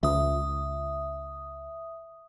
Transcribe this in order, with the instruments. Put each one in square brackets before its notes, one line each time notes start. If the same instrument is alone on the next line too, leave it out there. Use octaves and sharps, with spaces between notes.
[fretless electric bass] C#2 [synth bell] E5 D#6